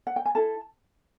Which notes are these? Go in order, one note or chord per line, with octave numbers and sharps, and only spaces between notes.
F#5
G5
G#5
E4 A4 A5